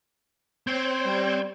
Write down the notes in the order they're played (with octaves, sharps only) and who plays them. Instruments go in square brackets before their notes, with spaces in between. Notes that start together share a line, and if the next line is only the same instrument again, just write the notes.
[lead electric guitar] C4 [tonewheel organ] C5 C#5 G5
[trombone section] G3